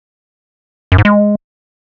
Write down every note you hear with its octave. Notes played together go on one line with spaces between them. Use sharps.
F#2
G#2
G#3